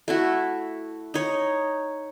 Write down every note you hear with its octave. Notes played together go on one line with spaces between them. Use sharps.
A3 E4 F#4
D#4 C#5